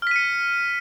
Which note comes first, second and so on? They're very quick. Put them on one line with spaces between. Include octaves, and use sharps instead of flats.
F6 B6 D#7 C#7